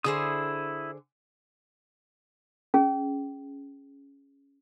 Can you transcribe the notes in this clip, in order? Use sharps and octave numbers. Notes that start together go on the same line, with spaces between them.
D3 E4 G#4 C5 D#6
C#4 G#4